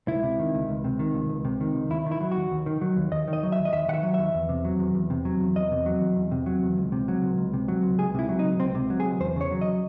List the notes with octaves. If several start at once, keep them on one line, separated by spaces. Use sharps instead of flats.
C#2 E4
C3
D#3
C#2
C#2
C3
D#3
C#2
C#2
C3
D#3
C#2
D#2 E4
D#3
E4
F#3
D#2 F#4
D#2
D#3
F#3
D#2
D#2 D#5
D#3
D#5
F#3
E5
D#2
D#5
D#2 E5
D#3 F#5
E5
F#3
D#2 E5
E2
C3
F#3
E2
E2
C3
F#3
E2
E2 D#5
C3
F#3
E2
E2
C3
F#3
E2
C#2
C3
F#3
C#2
C#2
C3
F#3
C#2
C#2 G#4
C3 E4
F#3
D#4
C#2
C#2 C4
C3
F#3
G#4
C#2
E2 C5
C#3 C#5
F#3
D#5